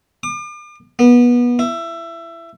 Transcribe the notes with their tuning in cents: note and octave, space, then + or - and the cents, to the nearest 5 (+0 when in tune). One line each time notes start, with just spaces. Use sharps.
D6 +45
B3 -25
E4 +20